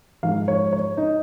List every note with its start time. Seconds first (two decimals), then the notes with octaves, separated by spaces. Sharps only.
0.23 G#2 F3 G#3 F5
0.48 C#5
0.73 C#5
0.97 D#4